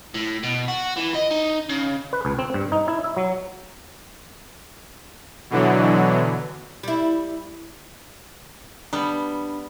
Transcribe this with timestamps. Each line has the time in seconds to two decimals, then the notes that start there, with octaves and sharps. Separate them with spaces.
0.14 A2
0.43 B2
0.68 F#4
0.97 E3
1.14 D#5
1.31 D#4
1.69 C#3
2.13 B4
2.25 C#2
2.39 C4
2.54 G2
2.72 D#4
2.88 E4
3.04 E5
3.17 F#3
5.50 B2 D3 E3 F#3
6.83 G3 E4
8.93 G3 B3 D4